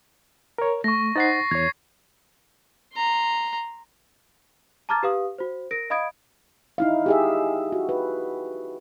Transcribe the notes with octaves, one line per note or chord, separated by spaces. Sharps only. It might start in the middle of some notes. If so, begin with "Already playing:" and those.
A#4 C#5
A3 C#6 A#6
D#4 C5 F#5 A6 C7
E2 C#5 G#6
A#5 C6
A5 A#5 D6 F6 G#6 A6
G4 B4 F5 D#6
F#4 C5
A#4 A#6 D7
D#5 F5 B5 D#6 G#6 D7
D#4 E4 F5
G4 G#4 E5
F#4
B4